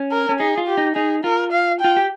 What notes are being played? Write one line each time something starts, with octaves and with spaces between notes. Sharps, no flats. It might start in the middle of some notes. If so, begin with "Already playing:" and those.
Already playing: C#4
A#4
C#4
D#4 G#4
F4
G4
D#4
D#4 G#4
F4 A#4
F5
F4 G5
G4